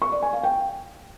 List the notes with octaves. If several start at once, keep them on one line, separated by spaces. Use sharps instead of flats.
C#6
D5
G#5
F5
G5